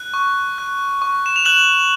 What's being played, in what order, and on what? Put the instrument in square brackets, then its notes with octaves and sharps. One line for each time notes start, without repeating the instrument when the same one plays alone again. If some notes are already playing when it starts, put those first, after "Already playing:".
Already playing: [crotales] F#6
C#6
F#6
C#6
E7
F7
F#6 E7 F#7